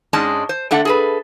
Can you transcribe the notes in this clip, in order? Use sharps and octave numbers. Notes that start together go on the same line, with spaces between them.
G#2 G#3 C#4 D4 D#5 A5
C5
D3 A3 D4 F#5
G#4 A4 B4